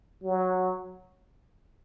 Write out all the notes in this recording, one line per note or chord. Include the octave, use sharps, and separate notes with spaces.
F#3